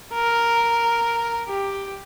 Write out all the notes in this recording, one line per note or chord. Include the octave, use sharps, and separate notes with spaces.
A#4
G4